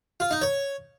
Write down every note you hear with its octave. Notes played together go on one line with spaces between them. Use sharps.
F4
D#4
C#5